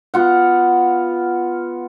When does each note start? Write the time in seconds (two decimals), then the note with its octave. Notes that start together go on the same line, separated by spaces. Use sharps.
0.14 B3 F4 F#5